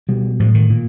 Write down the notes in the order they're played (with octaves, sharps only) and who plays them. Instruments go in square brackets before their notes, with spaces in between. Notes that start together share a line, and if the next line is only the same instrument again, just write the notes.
[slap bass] B2 G3
A2 F3
D#3
A#2